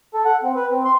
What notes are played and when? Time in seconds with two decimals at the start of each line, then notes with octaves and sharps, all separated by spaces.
0.14 A4
0.25 F#5
0.43 C4
0.56 B4
0.71 C4
0.85 C6